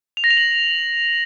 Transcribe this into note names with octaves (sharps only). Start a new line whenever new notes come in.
F7
A#6
F7
F#7